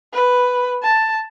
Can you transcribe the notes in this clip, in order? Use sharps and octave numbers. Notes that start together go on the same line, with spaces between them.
B4
A5